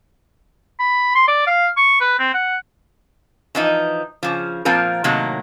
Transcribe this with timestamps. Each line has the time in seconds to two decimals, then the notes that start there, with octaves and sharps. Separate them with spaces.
0.79 B5
1.15 C6
1.28 D5
1.47 F5
1.77 C#6
2.01 B4
2.19 C4
2.34 F#5
3.55 E3 F3 D#4
4.23 C#3 F3
4.65 A#2 F3 C4 F4 A#4
5.04 A2 C3 D#3 F#3 A#3